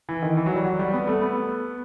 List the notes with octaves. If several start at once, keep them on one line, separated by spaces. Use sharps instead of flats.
E3
D#3
E3
F#3
G3
F#3
G3
B3
A3
B3